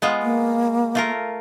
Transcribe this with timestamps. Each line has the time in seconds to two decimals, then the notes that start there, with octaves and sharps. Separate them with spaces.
0.02 G#3 B3 F4
0.23 A#3
0.95 A3 F4 A#4